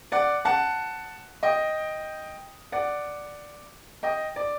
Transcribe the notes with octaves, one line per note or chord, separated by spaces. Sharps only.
D5 F#5
F#5 A5
D#5 G5
D5 F#5
D#5 G5
D5